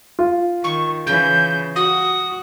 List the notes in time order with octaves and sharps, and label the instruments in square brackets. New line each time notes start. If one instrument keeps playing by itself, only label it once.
[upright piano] F4
[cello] D#3 [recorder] C#6
[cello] C#3 E3 [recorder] G6
[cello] F#4 [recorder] D#6